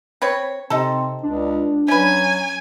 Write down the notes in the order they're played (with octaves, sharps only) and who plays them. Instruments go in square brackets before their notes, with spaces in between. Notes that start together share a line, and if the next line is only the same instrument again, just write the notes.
[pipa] C4 B4 C#5
[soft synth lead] C3 [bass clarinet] C4 [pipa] D#4 A4
[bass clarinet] C#2 [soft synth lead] D4
[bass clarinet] F#3 [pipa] C#4 B4 [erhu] G#5